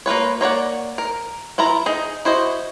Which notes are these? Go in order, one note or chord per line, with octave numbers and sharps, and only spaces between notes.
A#3 F4 B4 C#5
A#3 C#5 D5 F#5
A#4
E3 E4 F4 A#5
D#4 G#4
E4 F#4 C5 D#5